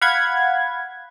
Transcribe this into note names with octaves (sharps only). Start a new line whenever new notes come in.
F5 F#5 B5 G#6